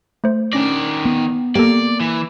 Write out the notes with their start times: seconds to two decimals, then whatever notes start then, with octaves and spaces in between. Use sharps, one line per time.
0.24 A3 C5
0.53 D#3 C#4 D4 D5 A#6
1.05 B3
1.55 A#3 G4 A4 D5
2.00 E3